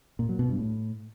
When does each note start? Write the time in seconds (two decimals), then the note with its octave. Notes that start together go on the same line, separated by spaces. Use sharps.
0.19 A#2
0.29 F#3
0.39 B2
0.49 G2
0.59 A2